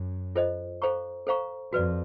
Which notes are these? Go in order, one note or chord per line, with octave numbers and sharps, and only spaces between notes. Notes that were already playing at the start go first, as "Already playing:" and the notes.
Already playing: F#2
F4 A4 C5 D#5
A4 C5 F5 A#5 C#6
A4 C5 F5 A#5 C#6
F2 F#4 B4 D5